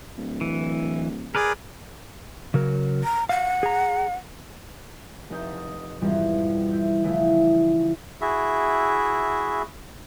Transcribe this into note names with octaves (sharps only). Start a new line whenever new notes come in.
D1
E3
G#4 A#4 B4 D5
C#3 F#3 A#4
A#5
F5 F#5
G#4 A#5
F1 D#4 D#5 G6 A6
F2 G#2 B2 E3 F3 G3
E4 G6
C#3 E3 F3 A3 E4
E4 F#4 G#4 E5